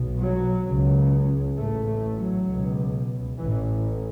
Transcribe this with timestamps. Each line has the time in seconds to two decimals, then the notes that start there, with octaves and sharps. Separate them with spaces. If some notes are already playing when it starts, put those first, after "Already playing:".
Already playing: B1 B2
0.21 F#3
0.66 C#2 C#3
1.56 A1 A2 A3
1.87 A3
2.18 F#3
2.47 C#2 B2
3.38 A1 A2 E3